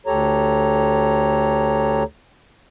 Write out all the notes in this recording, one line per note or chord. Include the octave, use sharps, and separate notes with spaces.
D2 G4 A4 C#5 A#5